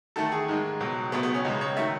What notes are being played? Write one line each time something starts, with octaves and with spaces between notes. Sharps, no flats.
E2 D#3 A3 A4
G#4
G#2 D#3 G#3
C#2 B2 F#3
C#2 B2 A3 B3
B3
C#4
C#2 C#3 G#3 D#4
C#5
D#3 F#3 A3 E5